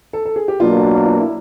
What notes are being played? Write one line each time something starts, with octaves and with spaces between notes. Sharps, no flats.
A4
A4
G#4
G4
B2 F#3 A#3 D4 F4
F4
E4